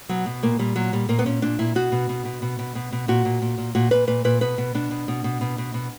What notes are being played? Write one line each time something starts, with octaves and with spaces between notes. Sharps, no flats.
B2 F#3
B2
A#2 A#3
A#2 G3
A#2 F#3
A#2 G3
A#2 A#3
B3
A#2 C#4
A#2 D4
A#2 E4
B2 F#4
B2
B2
B2
B2
B2
B2
B2
A#2 F#4
A#2
A#2
A#2
A#2 F#4
A#2 B4
A#2 B4
A#2 B4
B2 B4
B2
B2 D4
B2
B2
B2
B2
B2
B2